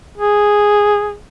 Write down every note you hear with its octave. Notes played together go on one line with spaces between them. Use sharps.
G#4